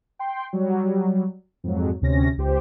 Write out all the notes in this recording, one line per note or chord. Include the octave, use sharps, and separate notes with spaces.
G5 C6
F#3 G3
F2 G#2 F#3
D2 C3 C#4 A#6
C#2 G4 C5